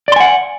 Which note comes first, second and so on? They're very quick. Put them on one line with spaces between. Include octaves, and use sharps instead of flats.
D5 C6 G#5 F#5